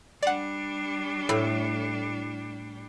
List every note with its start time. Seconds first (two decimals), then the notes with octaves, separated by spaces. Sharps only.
0.23 G3 D4 D5 F#5
1.29 A2 B5